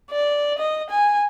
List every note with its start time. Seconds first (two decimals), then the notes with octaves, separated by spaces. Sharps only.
0.12 D5
0.59 D#5
0.90 G#5